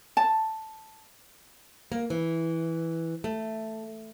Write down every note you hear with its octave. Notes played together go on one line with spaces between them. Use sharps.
A5
A#3
E3
A3